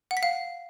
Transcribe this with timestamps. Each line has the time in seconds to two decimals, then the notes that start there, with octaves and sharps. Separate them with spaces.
0.11 F#5
0.17 B6
0.23 F5